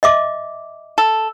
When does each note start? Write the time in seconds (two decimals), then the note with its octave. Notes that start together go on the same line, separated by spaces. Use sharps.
0.03 D#5 E5 D6
0.98 A4